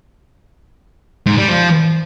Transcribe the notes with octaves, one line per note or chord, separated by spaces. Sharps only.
G#2
G3
F3